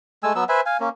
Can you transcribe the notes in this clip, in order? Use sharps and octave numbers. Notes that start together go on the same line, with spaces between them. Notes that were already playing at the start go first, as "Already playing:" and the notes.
G#3 A3 G#5 E6
F#3 B3 E6
B4 C5 E5 G#5
F5 G#5
A#3 C#4